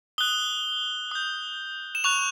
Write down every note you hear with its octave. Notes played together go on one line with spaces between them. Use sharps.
D#6 F#6 G7
D#6 G6
E7
C#6 F#6 F7